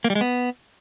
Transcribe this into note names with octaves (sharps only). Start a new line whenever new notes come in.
A#3
G3
G#3
B3